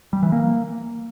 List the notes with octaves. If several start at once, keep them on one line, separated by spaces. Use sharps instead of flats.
G3
E3
A#3